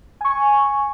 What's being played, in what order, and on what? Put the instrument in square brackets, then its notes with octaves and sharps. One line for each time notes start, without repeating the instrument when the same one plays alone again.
[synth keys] G#5 C#6